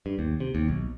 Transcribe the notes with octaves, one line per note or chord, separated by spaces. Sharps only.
G2
D#2
C3
D#2
B1